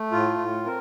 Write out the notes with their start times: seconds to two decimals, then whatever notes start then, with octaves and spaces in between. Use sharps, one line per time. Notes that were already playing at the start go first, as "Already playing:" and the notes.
Already playing: A3
0.12 A2 F4
0.39 A2
0.65 C4 A#4